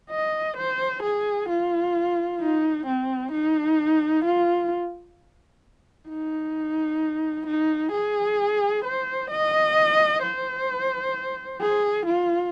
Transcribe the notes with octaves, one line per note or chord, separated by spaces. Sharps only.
D#5
C5
G#4
F4
D#4
C4
D#4
F4
D#4
D#4
G#4
C5
D#5
C5
G#4
F4